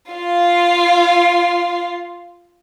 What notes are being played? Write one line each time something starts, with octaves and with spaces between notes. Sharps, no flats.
F4 F5